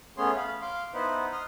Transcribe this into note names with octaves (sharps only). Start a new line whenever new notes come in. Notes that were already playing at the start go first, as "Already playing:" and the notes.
A3 B3 C#4 G#4 C#5 C6
F5 B5
F5 C6 D6
B3 D#4 E4 B4 C5 F#5
C6 D#6 F6